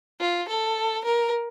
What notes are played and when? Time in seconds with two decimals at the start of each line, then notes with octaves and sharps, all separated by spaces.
0.20 F4
0.49 A4
1.05 A#4